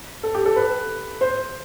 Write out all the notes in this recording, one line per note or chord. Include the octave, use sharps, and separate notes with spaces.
A4
G4
A4
B4
C5